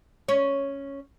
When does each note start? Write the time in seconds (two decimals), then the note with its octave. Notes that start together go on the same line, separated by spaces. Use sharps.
0.28 C#4 C#5